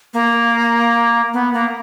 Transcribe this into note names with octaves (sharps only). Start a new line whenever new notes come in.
A#3
B3
A#3